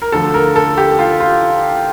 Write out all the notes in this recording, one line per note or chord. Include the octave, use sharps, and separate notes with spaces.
A#4
D2 D3 F3 A4
A#4
A4
G4
F4
F4